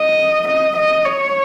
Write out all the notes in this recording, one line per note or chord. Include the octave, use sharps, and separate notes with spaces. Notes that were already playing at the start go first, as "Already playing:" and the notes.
Already playing: D#5
D#5
D#5
C#5